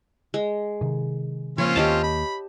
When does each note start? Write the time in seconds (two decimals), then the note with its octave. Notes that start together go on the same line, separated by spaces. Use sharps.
0.34 G#3
0.81 C3 D#3
1.58 C#3 F3 A#3 C4 C#4 F4 C#5
1.76 D#2 D#3 A#3 G4 D#5 A5
2.03 B5